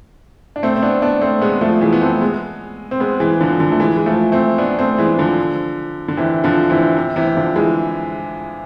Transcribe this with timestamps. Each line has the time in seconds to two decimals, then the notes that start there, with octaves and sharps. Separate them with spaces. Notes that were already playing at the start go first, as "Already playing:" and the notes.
0.56 D4
0.63 A3 C4
0.76 C4
0.82 B3 D4
1.02 B3 D4
1.22 A3 C4
1.42 G#3 B3
1.61 F3 A3
1.81 E3 G#3
1.93 B3
2.01 A3 C4
2.21 G#3 B3
2.91 C4
3.00 G#3 B3
3.20 E3 G#3
3.40 D3 F3
3.60 D3 F3
3.72 A3
3.80 E3 G#3
3.97 G#3
4.06 F3 A3
4.32 A3 C4
4.58 B3 D4
4.79 A3 C4
4.98 E3 G#3
5.18 D3 F3
6.08 D3
6.17 C3 E3
6.44 D3 F3
6.70 C3 E3
6.97 C3
7.16 C3 E3
7.36 D3 F3
7.56 E3 G#3